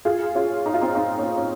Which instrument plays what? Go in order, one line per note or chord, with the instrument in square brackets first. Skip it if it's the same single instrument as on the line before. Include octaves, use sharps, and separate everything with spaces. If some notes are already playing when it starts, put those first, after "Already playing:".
[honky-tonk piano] F4 G#4
C#4 F4
D#4
F4
C4 D#4
C4 D#4
A#3 C#4
C#4